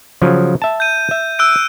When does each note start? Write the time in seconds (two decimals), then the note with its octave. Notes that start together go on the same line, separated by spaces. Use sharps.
0.22 C#3 F3 F#3
0.62 E5 A5
0.80 G6 D#7
1.11 E5
1.39 E6 F#6 D7